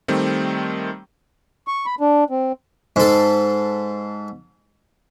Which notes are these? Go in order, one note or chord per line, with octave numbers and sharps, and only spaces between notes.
D#3 G3 A3 C4
C#6
B5
D4
C4
G#2 A4